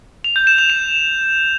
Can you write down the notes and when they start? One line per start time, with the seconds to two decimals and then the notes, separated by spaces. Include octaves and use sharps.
0.24 F7
0.36 G6
0.47 E7
0.58 F7
0.70 E7